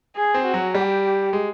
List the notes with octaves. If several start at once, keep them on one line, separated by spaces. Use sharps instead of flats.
G#4
C4
F#4
F#3
G3 G4
G#3